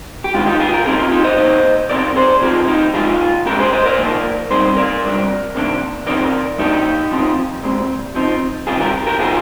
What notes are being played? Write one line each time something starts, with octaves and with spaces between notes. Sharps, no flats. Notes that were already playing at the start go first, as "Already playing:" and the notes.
G4
D#3 G#3 D4 F4
D#4 G4
F4 G#4
G4 A#4
A#2 F3 C4 D#4 F4 G#4
F4
D#4 G4
C5 D#5
D#3 A#3 D#4 C5 D#5
C3 F3 C4 D#4 A#4 D5
G#4 C5
C3 F3 C4 D#4 F4 G#4
D#4 G4
A#2 F3 G#3 D#4 F4 G#4
A#2 G#3 D4 G4 A#4
G#4 C5
C5 D#5
A#4 D5
A#2 F3 A#3 D#4
A#2 G3 C4 D#4 G#4 C5
A#4 D5
C3 G3 D4
C3 D#3 A#3 D4
D3 F3 C4 D#4 A#4 D5
F3 A#3 D4 D#4 G4
F3 C4 D#4
A#2 G#3 C4
F3 C4 D#4
C3 D#3 G3 F4 G#4
G4 A#4
G4 A#4
C3 F3 C4 D#4 F4 G#4